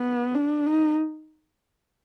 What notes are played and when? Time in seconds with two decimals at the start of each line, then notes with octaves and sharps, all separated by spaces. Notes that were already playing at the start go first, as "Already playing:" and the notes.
Already playing: B3
0.35 D4
0.66 D#4